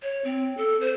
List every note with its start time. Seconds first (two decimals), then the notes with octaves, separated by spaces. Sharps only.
0.03 C#5
0.24 C4
0.57 A4
0.81 C5